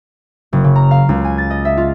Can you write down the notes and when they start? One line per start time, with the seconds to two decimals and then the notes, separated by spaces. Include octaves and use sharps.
0.53 F#1
0.64 C#3
0.75 A#5
0.91 F5
1.09 C#2
1.24 G#5
1.38 A6
1.50 D#5
1.65 E5
1.77 F4